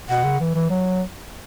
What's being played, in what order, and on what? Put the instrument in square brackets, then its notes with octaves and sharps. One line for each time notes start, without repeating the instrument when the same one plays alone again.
[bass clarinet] B2 [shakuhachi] F#5
[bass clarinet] C#3
E3
E3
F#3